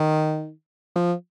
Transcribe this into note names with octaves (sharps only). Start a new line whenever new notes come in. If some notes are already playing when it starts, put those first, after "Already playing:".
Already playing: D#3
F3